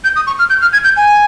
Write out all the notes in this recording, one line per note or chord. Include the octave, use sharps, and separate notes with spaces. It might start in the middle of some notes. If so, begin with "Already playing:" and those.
G6
D#6
C#6
F6
G6
F6
G#6
G6
G#5